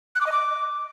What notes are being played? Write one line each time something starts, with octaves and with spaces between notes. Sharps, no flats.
F#6
D6
D#5
D6